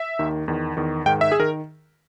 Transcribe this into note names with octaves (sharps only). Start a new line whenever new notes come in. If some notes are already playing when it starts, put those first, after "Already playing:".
Already playing: E5
D#2 D#3
E2 D#3
E2 D#3
G#2 D#3 G5
E5
G#4
D#3 A#4